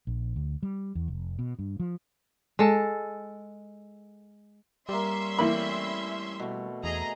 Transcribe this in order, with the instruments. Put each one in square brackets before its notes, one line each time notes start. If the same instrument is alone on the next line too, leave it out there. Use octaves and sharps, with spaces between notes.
[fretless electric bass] A#1
D2
G3
E2
F1
B2
G2
F3
[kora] G#3 A4
[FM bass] G3 [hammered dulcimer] A#3 D5 [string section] C#4 E5 C6
[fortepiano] E3 A#3 B5 [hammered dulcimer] A3 C4
[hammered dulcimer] B2 A3
[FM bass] E2 [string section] G#4 D#5 A#5